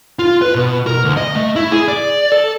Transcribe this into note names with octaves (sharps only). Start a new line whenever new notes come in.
F4
B4
B2
A#4
D2
D#5
A3
E4
G#4
D5
A4